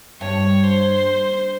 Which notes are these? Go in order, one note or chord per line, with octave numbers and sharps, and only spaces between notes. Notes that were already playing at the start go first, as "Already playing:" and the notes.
G2 C#5
C5